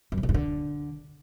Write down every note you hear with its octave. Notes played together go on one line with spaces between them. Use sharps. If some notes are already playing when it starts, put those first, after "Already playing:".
F#2
C3
D3
G2
D3